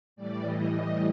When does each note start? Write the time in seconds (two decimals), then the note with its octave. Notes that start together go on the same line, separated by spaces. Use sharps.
0.16 A2 E3 G3 D5
0.45 D#5
0.75 D#5